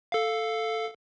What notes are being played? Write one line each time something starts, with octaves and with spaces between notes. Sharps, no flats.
A4 F5